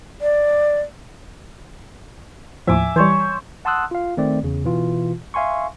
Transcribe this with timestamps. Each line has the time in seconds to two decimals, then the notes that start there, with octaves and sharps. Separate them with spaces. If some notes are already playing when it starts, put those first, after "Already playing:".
0.21 D5
2.67 D#2 A2 F3 E5 G#5 D6
2.96 E3 G3 C5 C#5
3.65 F#5 A5 C6 D#6 E6 F#6
3.91 F4 F5
4.17 D#3 A3 C4 D5
4.43 E2 C#3
4.64 B2 E3 F4
5.34 E5 F5 G#5 C6 C#6